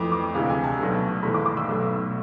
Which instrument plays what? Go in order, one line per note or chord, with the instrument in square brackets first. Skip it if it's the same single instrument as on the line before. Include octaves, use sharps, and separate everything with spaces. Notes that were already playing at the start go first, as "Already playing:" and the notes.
Already playing: [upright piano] F2 E3 A3 D6
D6
D2 C3 E3 G#3 F5
G#5
A5
B1 B2 A3
G#1 G#2 E3 A3 B5
D6
D6
E6
B1 B2 A3